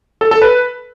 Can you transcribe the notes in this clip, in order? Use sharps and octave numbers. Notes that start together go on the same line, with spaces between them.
A4
A4
B4